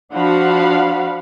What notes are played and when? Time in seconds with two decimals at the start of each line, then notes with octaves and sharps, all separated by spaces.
0.13 F3 D4 F#4 F5 F#5 B5